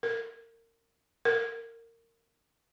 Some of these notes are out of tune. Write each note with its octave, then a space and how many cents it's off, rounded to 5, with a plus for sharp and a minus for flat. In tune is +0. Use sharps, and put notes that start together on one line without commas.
A#4 -25
A#4 -20